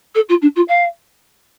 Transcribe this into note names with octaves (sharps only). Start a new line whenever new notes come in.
A4
F4
D4
F4
F5